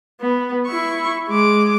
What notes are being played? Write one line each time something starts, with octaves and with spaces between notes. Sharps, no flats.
B3
E4 C#6
G#3 D6